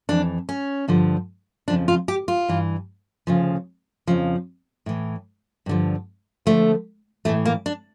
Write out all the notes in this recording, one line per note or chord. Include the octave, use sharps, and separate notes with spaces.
F2 E3 D4
C#4
G2 D3 F3
F2 C#3 F3 D4
F4
G4
F4
G2 E3
D2 C#3 F3
F2 C#3 F3
A2 E3
G2 D3 F3
D2 D3 F3 A3
A2 E3 A3
A#3
D4